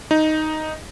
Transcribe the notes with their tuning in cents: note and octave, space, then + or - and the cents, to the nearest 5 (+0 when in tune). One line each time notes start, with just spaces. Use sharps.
D#4 +0